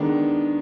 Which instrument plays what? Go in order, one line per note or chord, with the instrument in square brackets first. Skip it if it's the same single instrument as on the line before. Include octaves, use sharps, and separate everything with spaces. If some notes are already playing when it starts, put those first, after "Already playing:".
Already playing: [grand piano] D#3 G#3 B3 D4